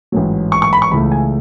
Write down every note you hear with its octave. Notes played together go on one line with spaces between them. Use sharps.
A1 G#2 F#3
C#6
C#6
B5
C#6
C#2 C#3 E3 A3 B5
G#5